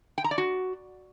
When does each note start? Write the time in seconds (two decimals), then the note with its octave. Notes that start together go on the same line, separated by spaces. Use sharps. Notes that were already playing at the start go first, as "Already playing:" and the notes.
0.18 G5
0.24 A#5
0.31 D5
0.38 F#4